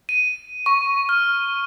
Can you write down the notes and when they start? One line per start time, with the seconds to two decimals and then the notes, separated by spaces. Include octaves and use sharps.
0.09 D#7
0.66 C#6
1.09 F6